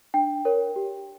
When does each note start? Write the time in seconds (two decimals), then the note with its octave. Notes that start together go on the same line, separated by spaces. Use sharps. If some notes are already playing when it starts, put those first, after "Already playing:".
0.14 D4 G5
0.45 A#4 C#5
0.76 G4